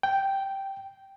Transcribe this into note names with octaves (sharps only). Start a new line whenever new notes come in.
G5